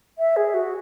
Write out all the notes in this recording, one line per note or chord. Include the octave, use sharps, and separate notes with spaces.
E5
G#4
F#4